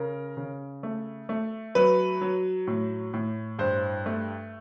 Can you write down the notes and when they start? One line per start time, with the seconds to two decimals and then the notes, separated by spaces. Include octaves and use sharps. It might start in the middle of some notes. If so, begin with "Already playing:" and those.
Already playing: C#3 A#4
0.37 C#3
0.83 A3
1.29 A3
1.75 F#3 B4
2.21 F#3
2.67 A2
3.13 A2
3.59 G2 C5
4.06 A3